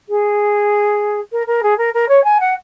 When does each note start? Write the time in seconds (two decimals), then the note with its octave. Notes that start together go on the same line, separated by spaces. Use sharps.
0.09 G#4
1.32 A#4
1.47 A#4
1.62 G#4
1.78 A#4
1.94 A#4
2.08 C#5
2.24 G#5
2.40 F#5